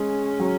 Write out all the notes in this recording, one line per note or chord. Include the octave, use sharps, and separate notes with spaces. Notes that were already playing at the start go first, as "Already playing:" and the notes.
Already playing: G#3 C#4 G#4
F#3 F#4